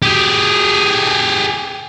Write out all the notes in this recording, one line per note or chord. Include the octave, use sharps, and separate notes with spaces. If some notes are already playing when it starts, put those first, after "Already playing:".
G4 G#4